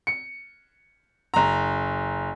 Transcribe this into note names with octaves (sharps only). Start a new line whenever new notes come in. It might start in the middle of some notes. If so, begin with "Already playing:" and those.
C#7
F#1 A#5